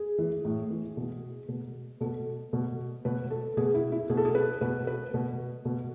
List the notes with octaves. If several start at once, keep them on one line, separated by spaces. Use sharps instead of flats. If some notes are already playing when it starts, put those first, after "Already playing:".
Already playing: G#4
E3
A2
E3
B2
B2
B2 A4
B2
B2 B4
A4
B2 G#4
E4
E4
B2 G#4
A4
G#4
B4
B2 B4
B4
B2
B2